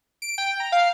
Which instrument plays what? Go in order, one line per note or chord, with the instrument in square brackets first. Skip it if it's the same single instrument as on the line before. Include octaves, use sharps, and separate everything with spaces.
[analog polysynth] D7
G5
A#5
F5